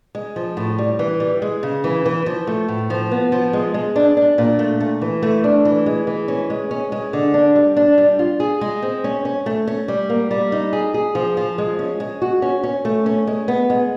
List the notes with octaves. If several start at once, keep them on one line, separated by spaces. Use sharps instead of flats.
G#3
F3
A2
G3
E3
G3
G#3
C#3
E3
E3
F3
A3
A2
F3
B3
F3
G#3
G#3
D4
D4
A#2
A3
A3
E3
A3
D4
E3
G#3
E3
C#4
G#3
C#4
G#3
D3
D4
G3
D4
G3
F4
G#4
G#3
C4
C#4
C#4
A3
C#4
G3
A#3
G3
D#4
G#4
G#4
F3
F3
G#3
C#4
G#3
F#4
C#4
C#4
A3
C#4
G#3
B3
G#3